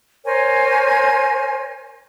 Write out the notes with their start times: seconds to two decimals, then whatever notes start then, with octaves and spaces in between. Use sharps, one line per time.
0.24 A#4 C5 C#5 G#5